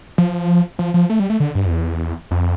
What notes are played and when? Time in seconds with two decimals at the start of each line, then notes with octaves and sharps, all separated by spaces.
0.18 F3
0.79 F3
0.94 F3
1.10 A3
1.20 G3
1.30 A3
1.40 D3
1.55 G2
1.66 F2
1.70 E2
2.31 F2